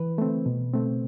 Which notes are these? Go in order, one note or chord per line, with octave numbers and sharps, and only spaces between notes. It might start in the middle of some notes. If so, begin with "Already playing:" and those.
Already playing: E3 B4
A3 C4
B2
A3 C4